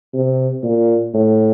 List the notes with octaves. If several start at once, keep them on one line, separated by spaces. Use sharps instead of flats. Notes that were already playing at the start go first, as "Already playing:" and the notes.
C3
A#2
A2